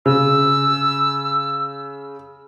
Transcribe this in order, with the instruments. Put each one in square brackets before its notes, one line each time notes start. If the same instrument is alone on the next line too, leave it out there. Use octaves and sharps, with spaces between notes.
[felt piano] C#3 [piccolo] E6